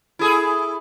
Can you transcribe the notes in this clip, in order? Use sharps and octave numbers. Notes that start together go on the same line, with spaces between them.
E4 G#4 A4